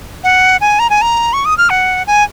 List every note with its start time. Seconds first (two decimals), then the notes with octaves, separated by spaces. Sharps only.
0.24 F#5
0.61 G#5
0.79 A#5
0.90 G#5
1.01 A#5
1.33 C#6
1.45 D#6
1.58 F6
1.70 F#5
2.07 G#5